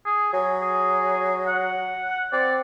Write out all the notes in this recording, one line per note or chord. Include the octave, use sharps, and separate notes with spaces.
G#4
F#3 G#5
G#4
F#5
C4 D5